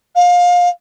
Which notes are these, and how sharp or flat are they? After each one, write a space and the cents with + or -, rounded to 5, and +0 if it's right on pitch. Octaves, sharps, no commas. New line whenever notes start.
F5 +25